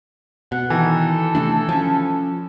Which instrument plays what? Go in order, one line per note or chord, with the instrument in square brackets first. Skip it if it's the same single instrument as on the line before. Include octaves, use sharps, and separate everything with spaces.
[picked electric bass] B2 [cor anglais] F#5
[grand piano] D#3 E3 [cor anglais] A4
[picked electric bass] C3 A3 D4
F3 C#4